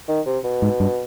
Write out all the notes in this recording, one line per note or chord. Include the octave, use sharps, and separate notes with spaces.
D#3
C3
B2
G#2
G2